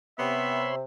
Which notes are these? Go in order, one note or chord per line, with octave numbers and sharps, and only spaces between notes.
C3 B3 C#5 E5 B5 C6